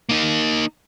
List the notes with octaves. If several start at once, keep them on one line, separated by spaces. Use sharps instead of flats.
A#3 D#4